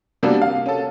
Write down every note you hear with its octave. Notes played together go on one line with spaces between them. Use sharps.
C3 G3 A#3 B3 D4 F#4
F5
C#4 A4